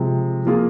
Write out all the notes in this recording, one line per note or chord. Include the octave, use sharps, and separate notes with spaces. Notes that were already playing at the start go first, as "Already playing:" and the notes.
Already playing: C3 F3 G#3
F3 A#3 F4 G#4